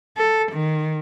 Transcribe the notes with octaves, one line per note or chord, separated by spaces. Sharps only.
A4
D#3